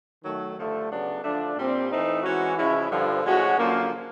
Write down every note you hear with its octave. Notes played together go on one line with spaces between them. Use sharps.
D#3 F#3 A3
G2 D3 F3 A3
C#3 F#3 B3 D4
D3 F3 A3 D4
A#2 G3 C4
E3 A3 C4 D#4
E3 G#3 C#4 F#4
C#3 F3 G#3 C#4 E4
G2 D3 F3
A2 F3 G#3 C#4 F#4
F#2 D3 F3 A#3